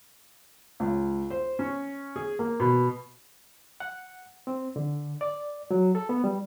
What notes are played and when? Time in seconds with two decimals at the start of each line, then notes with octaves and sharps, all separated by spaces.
0.80 C#2
1.30 C5
1.59 C#4
2.16 G#4
2.39 A#3
2.60 B2
3.80 F#5
4.47 C4
4.76 D3
5.21 D5
5.71 F#3
5.95 A4
6.09 B3
6.24 G3